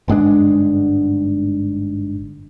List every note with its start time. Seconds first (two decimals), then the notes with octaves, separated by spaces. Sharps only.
0.08 G1 G#2 G#3 D4